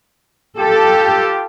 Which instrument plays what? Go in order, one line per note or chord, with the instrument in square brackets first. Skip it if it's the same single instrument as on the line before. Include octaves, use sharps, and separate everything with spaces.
[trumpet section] F4 G4 [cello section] A4